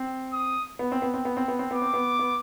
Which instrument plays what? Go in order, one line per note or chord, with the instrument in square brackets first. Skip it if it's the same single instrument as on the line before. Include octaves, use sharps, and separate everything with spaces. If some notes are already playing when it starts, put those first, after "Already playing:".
Already playing: [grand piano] C4
[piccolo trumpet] D#6
[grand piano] B3
C4
B3
C4
B3
C4
B3
C4
[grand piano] B3 [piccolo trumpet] D6
[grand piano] C4
B3
B3